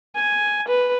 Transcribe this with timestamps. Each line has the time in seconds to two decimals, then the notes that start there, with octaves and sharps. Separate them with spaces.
0.16 G#5
0.68 B4